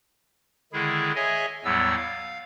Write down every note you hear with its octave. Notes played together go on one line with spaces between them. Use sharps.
D3 D#3 G#3 E4 G#4
G#4 C#5 D#5 E5 G#5
E2 A2 F#3 G3 B3 E6
F5